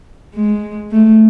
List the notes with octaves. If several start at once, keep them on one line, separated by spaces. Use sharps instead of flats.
G#3
A3